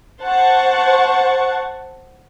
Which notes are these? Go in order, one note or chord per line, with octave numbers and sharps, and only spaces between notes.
C5 F#5 A5 C#6